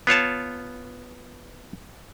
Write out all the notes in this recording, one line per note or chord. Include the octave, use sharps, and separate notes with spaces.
B3 F4 C#5 A5